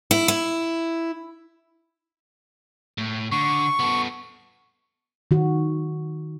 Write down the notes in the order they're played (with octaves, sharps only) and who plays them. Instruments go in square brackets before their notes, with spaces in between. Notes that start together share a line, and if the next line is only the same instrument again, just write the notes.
[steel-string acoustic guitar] E4
E4
[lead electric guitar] A2
[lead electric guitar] D3 [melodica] C#6
[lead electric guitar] B3 A4
[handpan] D#3 F#4